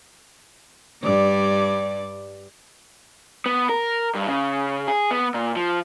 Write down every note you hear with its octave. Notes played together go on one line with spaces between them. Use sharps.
G2 G3 D5
B3
A#4
G2
C#3
G#4
B3
A#2
F3